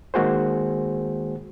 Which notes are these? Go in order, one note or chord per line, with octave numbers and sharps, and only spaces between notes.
D#3 G#3 A#3 F#4 G#4 C5